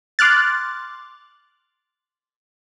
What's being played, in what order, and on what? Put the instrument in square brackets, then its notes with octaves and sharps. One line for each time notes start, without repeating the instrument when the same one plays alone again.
[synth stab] C6 D6 F6 F#6 A6